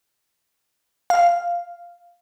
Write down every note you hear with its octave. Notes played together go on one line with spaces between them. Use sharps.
F5